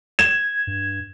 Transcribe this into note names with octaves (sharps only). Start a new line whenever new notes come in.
G#6 E7
G2